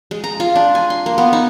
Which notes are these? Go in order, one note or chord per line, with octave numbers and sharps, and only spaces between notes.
G#3
A#5
F4
D4
G#5
C6
A#3
B3
D#4